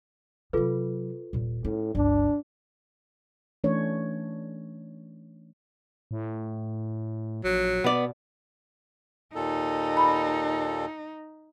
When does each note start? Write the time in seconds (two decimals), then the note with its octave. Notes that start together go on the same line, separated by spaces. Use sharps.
0.53 C3 F#3 F4 A4 B4
1.33 D#1 A#2
1.65 A2 C#4
1.95 G1 C#2 D4
3.64 E3 A3 C#4 D4 C#5
6.11 A2
7.44 A#1 F#3
7.84 B2 B3 D5
9.35 D#2 A#2 D#4 A4
9.97 B5